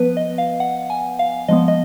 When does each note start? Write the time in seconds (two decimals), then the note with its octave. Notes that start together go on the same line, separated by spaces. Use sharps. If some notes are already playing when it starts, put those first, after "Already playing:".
Already playing: F3 B3 B4
0.17 D#5
0.38 F5
0.60 F#5
0.90 G#5
1.19 F5
1.48 F3 G#3 B3 D#5
1.68 D#5